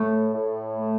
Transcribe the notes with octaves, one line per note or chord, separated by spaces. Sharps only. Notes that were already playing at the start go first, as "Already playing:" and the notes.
Already playing: A2 A3
A2
A3